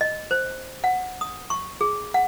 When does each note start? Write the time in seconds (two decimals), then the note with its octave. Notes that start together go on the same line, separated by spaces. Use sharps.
0.01 D#5
0.31 C5
0.84 F#5
1.21 D#6
1.50 C#6
1.81 G#4
2.14 F#5